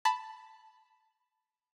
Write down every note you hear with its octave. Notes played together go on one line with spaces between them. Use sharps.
A5 B5